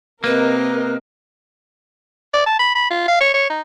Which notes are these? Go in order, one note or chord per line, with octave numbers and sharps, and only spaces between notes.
C3 A#3 C4 A#4 B4 D#5
D5
A5
B5
B5
F4
F5
C#5
C#5
D#4